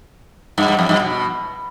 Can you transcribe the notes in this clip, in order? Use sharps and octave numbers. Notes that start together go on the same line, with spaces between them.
G2
G2
F2
G2
B2